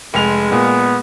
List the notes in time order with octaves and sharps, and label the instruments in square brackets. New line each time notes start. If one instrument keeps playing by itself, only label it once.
[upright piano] F1 G#4 F7 [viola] G#3
[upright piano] A#2 [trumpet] B3